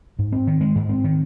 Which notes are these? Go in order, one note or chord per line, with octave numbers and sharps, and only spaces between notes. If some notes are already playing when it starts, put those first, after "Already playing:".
G#2
C4
D#3
G#3
G#2
C4
D#3